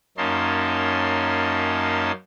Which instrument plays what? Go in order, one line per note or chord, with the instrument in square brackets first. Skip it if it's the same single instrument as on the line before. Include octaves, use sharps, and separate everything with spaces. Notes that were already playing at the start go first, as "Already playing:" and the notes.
[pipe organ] F#2 A#3 C#4 D#4 A5 C6